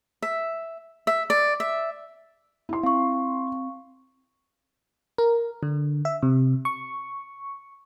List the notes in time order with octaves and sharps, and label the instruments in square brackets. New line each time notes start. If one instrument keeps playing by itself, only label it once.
[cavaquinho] E5
E5
D5
E5
[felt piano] E4 C6
[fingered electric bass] C4 [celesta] F5 C#6
[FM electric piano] A#4
D3
E5
C3
C#6